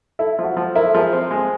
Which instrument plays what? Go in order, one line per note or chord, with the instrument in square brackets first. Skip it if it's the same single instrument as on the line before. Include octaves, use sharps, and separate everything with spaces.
[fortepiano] E4 [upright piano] A4
[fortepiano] F3
[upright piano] F#4
[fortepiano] F3
[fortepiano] E4 [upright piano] A#4
[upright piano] A4
[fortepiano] F3 [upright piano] G#4
[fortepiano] C4
G#3